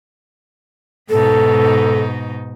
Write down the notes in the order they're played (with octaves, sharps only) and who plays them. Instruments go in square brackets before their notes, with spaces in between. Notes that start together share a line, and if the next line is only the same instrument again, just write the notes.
[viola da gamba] G#2 B2 D#4 [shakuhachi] A4